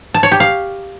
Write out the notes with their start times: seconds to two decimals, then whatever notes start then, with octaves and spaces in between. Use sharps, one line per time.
0.14 A5
0.23 C#5
0.32 G4
0.40 F5